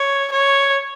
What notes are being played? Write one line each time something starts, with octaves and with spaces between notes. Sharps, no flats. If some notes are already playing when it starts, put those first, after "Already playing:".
Already playing: C#5
C#5